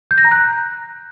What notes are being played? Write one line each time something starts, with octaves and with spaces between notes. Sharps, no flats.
G6
A#6
A#5
F#6